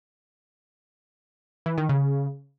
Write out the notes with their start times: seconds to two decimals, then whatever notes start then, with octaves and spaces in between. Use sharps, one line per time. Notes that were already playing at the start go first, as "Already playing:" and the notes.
1.66 E3
1.78 D#3
1.89 C#3